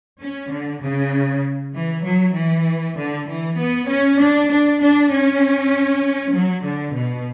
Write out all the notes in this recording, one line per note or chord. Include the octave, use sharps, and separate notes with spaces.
C#4
D3
C#3
E3
F#3
E3
D3
E3
B3
C#4
D4
D4
D4
C#4
F#3
D3
B2